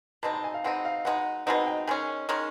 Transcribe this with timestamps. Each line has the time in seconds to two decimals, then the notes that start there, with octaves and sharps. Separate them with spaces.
0.23 B2 G#3 C4 D#4 A5
0.34 A5
0.44 G#5
0.54 F5
0.64 B2 G#3 C4 D#4 F#5
0.85 F5
1.05 B2 G#3 C4 D#4 F#5
1.46 B2 G#3 C4 D#4 F#5
1.67 G5
1.87 D#3 G#3 C#4 G#5
2.29 D#3 G#3 C#4